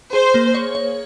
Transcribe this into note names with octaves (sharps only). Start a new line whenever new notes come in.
G#4 C5
A#3
C#5
C#5